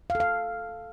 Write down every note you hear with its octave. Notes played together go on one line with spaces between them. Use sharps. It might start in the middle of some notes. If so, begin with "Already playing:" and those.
F5
A4
F5